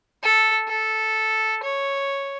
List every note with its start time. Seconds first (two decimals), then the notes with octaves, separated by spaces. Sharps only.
0.23 A4
0.68 A4
1.64 C#5